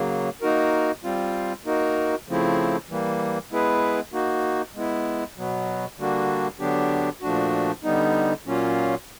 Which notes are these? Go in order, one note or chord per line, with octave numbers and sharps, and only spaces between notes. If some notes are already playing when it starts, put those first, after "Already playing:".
Already playing: C#3 F#3 A#3
A#3 D#4 F#4 A#4
G3 C4 F4
A#3 D#4 F#4 A#4
C#3 F3 A3 C4 E4
E3 G3 A#3
G#3 B3 E4 G#4 B4
A#3 D#4 F#4
G#3 B3 E4
B2 F#3 B3
D3 G3 A#3 D4 F#4
D3 F#3 B3 D4 G4
A#2 F3 A3 D4 F#4
D3 G3 B3 D#4
A#2 F#3 A#3 C#4 F4